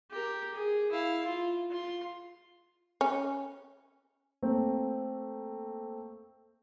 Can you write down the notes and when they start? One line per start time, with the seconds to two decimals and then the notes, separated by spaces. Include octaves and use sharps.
0.11 G4 A#4
0.54 G#4
0.91 E4 F5
1.25 F4
1.70 F4 C6
3.01 C#4
4.42 A3 A#3 C4